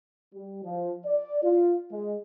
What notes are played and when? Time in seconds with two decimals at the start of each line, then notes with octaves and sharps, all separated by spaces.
0.34 G3
0.64 F3
1.05 D5
1.43 F4
1.92 G#3